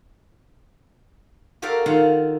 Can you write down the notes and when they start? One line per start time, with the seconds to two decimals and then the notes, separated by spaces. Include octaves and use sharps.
1.62 F#4 G4 A4 A#4 D5 F5
1.86 D#3 F4 F5 F#5